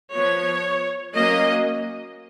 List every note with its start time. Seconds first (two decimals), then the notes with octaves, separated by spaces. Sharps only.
0.13 F3 B3 C#5
1.15 F#3 A#3 C#4 D#5